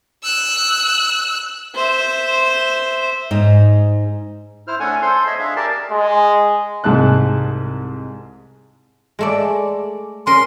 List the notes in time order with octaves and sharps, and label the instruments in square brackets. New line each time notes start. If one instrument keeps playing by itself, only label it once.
[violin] E6 F#6
[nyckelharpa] C5 E5
[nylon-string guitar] G#2 D#4
[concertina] E4 C5 F6
A3 C#4 D4 A4 F#5 G#5
A4 C5 C6
C#5 D#5 E5 B5
D4 G#4 E5 F5
G4 A#4 D5 A5
[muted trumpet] G#3
[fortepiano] C2 G#2 G#3 A5 F#6
[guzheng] G#3 A3 D5
[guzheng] C#4 A#4 [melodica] C6